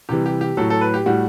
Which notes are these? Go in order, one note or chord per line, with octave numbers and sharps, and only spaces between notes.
C3 E3 G3 G4
G4
G4
A2 F#3 A4
A4
B4
G4
A2 G3 F#4